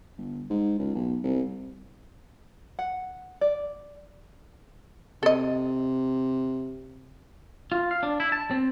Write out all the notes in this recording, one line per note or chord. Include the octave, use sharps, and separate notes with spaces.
G1
G#2
C#2
B1
C2
F#5
D5
C3 A4 D#5
F4
F5
D4
E4
A5
C4